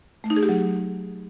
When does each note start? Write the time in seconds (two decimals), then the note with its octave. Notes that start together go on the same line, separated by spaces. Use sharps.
0.24 A3
0.30 D#4
0.36 G#4
0.43 G4
0.49 F#3